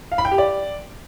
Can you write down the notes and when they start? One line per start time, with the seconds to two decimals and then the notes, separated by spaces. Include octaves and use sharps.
0.12 F5
0.18 B5
0.25 G5
0.32 G4
0.38 D5